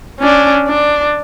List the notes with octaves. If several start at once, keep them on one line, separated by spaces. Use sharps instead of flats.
C#4 D4
D4